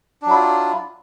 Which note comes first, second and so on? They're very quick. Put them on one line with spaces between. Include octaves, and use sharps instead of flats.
D4 F#3 E4 F4